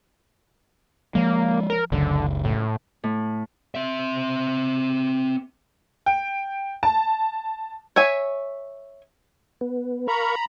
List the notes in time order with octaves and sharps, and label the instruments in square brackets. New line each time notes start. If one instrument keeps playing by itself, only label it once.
[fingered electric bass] F3 G#3 [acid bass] A#3
[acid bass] A#4
[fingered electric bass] F#1 C#2 [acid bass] D3
[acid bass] A2
[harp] A2
[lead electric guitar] C4 E5
[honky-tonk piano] G5
A5
[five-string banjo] C#5 E5 G#5
[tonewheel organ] B3
[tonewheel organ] A#4 F5 C#6 [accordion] A#5 B5